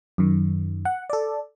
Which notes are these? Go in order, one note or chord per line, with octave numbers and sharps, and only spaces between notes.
F#2 D#3
F#5
A4 D5